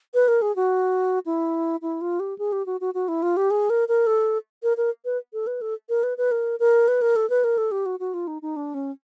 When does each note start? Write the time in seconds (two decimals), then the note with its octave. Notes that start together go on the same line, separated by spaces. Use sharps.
0.14 B4
0.28 A#4
0.42 G#4
0.56 F#4
1.26 E4
1.82 E4
2.01 F4
2.20 G4
2.38 G#4
2.52 G4
2.66 F#4
2.81 F#4
2.94 F#4
3.08 E4
3.22 F4
3.37 G4
3.50 G#4
3.70 A#4
3.88 A#4
4.07 A4
4.63 A#4
4.77 A#4
5.05 B4
5.33 A4
5.47 B4
5.61 A4
5.89 A#4
6.03 B4
6.18 B4
6.31 A#4
6.60 A#4
6.88 B4
7.01 A#4
7.16 A4
7.30 B4
7.44 A#4
7.58 A4
7.71 G4
7.86 F#4
8.00 F#4
8.14 F4
8.27 D#4
8.42 D#4
8.56 D4
8.74 C#4